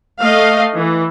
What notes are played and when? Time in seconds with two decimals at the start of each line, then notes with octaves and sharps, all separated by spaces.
0.22 A3 D#5 F5
0.75 E3